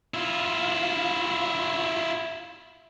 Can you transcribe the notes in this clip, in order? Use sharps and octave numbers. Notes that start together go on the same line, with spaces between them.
E4 F4